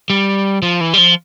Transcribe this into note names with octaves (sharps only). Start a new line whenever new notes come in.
G3
F3
E3
G3
F3